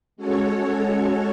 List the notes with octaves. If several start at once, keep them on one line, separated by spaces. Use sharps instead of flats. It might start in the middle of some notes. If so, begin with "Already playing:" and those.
G#3 C#4 F#4 A4 C#5